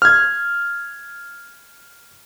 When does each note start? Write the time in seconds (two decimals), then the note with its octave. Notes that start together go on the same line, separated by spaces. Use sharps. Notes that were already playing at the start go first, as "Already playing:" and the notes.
0.02 F6 G#6